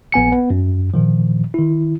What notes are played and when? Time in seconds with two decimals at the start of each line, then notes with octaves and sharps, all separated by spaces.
0.12 A#1 B3 G#5 C#7
0.32 B3
0.50 F#2
0.94 A#2 D#3 F3
1.54 D#3 E4